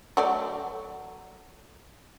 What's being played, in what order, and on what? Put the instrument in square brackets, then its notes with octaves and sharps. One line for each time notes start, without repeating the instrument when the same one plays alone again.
[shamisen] F#3 A3 D5